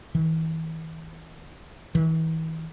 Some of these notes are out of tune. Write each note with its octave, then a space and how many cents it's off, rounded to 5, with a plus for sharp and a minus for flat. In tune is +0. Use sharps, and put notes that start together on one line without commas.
E3 -40
E3 -40